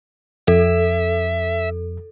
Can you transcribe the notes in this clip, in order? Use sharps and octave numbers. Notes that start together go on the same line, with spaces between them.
F2 A4 E5